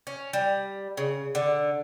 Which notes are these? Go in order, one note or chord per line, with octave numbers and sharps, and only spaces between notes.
C#4
G3
C#3
D3